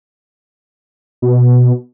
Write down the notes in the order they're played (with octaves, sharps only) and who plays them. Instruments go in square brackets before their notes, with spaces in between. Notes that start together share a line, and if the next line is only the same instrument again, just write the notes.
[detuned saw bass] B2